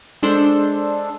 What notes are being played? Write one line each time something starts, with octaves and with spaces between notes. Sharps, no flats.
G#3 D4 A4 C5